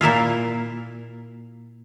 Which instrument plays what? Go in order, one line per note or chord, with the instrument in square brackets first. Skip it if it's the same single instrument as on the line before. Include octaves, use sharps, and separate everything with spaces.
[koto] A#2 A#3 E4 F4